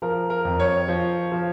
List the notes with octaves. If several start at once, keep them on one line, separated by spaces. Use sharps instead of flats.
F3 A#4
A#4
F2
C#5
F3
F3